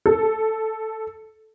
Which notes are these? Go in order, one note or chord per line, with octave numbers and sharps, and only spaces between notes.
A4